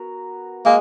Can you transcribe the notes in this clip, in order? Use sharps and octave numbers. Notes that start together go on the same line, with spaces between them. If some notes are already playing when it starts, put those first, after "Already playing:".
Already playing: B3 F#4 A#4
G#3 A#3